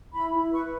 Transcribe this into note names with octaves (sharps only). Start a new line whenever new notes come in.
E4 B5
E4
B4 C#6